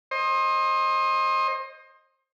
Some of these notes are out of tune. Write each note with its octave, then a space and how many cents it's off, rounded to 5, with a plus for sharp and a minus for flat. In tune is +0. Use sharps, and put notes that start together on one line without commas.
C5 +30 D#5 +0